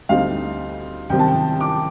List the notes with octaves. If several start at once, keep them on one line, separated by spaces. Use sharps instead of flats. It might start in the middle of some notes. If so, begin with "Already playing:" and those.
D2 D3 G3 C4 D#4 F5
C2 C3 D#3 G3 C4 G5
A5
G5
D6